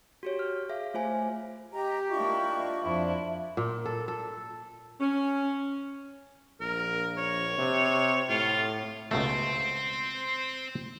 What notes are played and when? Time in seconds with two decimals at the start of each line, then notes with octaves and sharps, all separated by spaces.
0.23 F#4 G4 C#5
0.39 F6
0.69 G#4 E5 F5
0.94 A3 F4 C5 G#5
1.73 G4 D#5 A#5
2.11 A#3 D4 E4 F4 D#5 C#6
2.82 F2 F3 D4 E4
3.57 A#2
3.86 A4
4.08 A4
5.00 C#4
6.61 A#1 A#4
7.17 C#5
7.58 C3
8.29 A2 F4
9.11 C#2 B2 A3 C4 C5